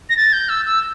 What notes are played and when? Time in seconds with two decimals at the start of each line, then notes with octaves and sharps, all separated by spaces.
0.09 A#6
0.17 A6
0.33 G6
0.49 E6
0.65 E6